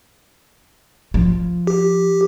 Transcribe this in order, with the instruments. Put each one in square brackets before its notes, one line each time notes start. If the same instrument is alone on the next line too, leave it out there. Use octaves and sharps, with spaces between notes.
[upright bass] F3
[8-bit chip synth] G4